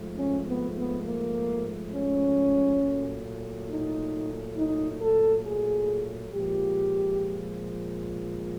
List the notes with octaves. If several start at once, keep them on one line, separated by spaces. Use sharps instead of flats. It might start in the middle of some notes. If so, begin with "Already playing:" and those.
Already playing: G#2 F3 A3
C#4
B3
B3
A#3
C#4
A#2 F#3 A3
D#4
D#4
A4
G#4
A#2 F3 G#3 G4